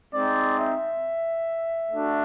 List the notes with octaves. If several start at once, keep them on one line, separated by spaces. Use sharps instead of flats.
G#3 C4 D#4 D5
E5
A3 D4 F#4